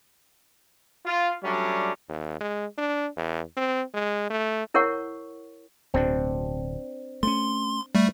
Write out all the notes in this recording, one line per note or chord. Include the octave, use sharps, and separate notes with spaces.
F4
F#3 G3 A3 C#4 D4
D#2
G#3
D4
E2
C4
G#3
A3
E4 A#4 C#5 F#5 C#6
D1 D2 B2 C4 D4
A3 B3 C#4 C6
G3 A3